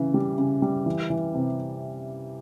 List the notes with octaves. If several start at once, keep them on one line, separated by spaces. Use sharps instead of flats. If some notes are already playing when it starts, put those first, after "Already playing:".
Already playing: C#3 E3
G3
C#3
G3
E3
E3
C3